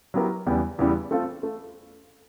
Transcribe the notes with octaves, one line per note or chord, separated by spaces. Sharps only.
F#3 B3 E4 G4 A#4
E2 C#3 E3 G3 B3
E2 C#3 E3 G3 B3
A3 C4 F4 A4
A3